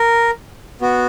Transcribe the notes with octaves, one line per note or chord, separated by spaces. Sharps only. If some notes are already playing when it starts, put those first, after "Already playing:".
Already playing: A#4
B3 F#4